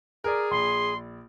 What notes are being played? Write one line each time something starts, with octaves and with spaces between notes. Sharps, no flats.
G#4 A#4 D5
A#1 B5 C6